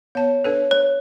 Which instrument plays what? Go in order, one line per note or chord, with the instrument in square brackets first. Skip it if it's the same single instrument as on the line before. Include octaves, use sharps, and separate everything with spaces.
[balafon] B3 A5 [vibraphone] C#5
[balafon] D4 A4 B4
[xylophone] C#5